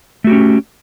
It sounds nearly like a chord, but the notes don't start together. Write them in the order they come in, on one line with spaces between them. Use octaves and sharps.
A3 F#4 G4 C#4